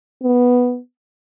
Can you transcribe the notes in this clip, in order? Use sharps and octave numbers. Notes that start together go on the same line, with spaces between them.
B3